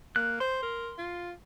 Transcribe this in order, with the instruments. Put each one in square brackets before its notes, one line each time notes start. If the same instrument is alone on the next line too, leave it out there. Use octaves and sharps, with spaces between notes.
[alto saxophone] A#3 [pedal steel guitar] F#6
[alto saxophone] C5 [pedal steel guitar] C6
[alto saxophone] A#4
F4